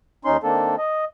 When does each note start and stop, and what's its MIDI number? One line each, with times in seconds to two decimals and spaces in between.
0.25 0.37 39
0.25 0.37 61
0.25 0.37 63
0.25 0.37 84
0.43 0.75 51
0.43 0.75 58
0.43 0.75 60
0.43 0.75 62
0.43 0.75 69
0.78 1.05 75